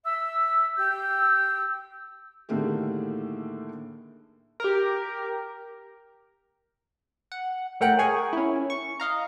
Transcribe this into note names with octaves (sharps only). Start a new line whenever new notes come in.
E5 E6
G4 E6 G6
A2 D3 D#3 A#3 G4 G#4
G4 A#4
F#5
A2 A3 A#4 F#5 G5 F#6
G#4 A#4 G#5 C#6
C#4 E4
C#6
D#5 F5 A#5